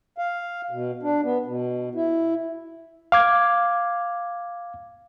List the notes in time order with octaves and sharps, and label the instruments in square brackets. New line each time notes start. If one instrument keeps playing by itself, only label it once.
[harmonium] F5
B2
D4
B3
B2
E4
[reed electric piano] F5 D6 G#6